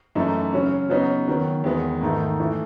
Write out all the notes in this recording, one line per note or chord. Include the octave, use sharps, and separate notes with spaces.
F#2 E3 A3 D#4
C#3 F#3 C#4
C#3 F#3 B3 D#4
D#3 F#3 B3
E2 D#3 G#3 B3
G#2 D#3 A3 D#4
E3 A3 E4